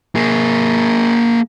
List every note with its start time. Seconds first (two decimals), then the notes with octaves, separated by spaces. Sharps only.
0.16 A#3 G#4